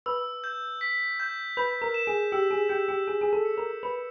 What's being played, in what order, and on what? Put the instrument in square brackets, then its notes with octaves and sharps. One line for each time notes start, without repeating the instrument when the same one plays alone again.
[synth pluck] B4 [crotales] E6
[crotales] G6
B6
G6
[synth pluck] B4 [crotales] G6
[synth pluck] A#4
[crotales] E7
[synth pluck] G#4
[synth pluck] G4 [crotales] E6
[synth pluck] G#4
[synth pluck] G4 [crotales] G6
[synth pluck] G4
[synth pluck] G#4 [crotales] G6
[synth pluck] G#4
A4
[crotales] C#7
[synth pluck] A#4
[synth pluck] B4 [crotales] C#7